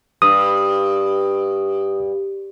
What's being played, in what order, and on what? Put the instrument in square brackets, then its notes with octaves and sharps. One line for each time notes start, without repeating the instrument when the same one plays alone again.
[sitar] G2 [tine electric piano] D#6